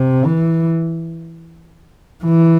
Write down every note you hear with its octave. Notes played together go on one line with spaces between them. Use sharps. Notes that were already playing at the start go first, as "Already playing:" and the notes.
Already playing: C3
E3
E3